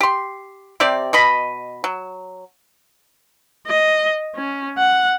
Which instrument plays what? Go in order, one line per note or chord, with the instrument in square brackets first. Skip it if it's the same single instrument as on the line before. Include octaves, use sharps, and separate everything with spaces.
[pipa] G4 C6
C3 C4 G4 D5
B2 D#5 B5
F#3
[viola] D#5
C#4
F#5